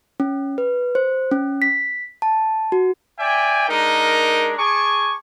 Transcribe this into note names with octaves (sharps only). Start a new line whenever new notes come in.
C#4
B4
C5
C#4
B6
A5
F#4
D5 E5 G5 G#5
G#3 D4 D#4 A#4
G#4 G#5 A5 C#6 D6